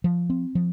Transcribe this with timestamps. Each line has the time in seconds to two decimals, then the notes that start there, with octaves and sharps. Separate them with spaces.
0.04 F3
0.30 C4
0.55 F3